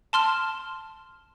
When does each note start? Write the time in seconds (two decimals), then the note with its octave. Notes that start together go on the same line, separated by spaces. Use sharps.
0.13 A5 C6 F6 E7